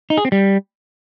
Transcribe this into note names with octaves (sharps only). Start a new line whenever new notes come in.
D#4
G#4
C4
G3